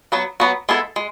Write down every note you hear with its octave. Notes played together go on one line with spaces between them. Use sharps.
F#3 B3 F#4
F#3 B3 F#4
G#3 B3 E4 A4
G#3